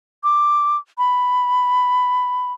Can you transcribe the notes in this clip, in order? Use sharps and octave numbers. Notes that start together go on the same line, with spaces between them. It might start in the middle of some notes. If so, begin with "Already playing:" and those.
D6
B5